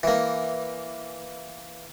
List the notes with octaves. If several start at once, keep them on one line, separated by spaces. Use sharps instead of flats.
E3 A#3